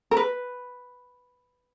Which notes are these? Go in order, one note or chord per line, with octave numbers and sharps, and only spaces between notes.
A#4
B4